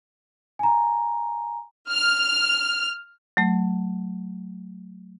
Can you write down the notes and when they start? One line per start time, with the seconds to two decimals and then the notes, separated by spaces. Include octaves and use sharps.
0.59 G#5 A#5
1.89 F6
3.37 F#3 A3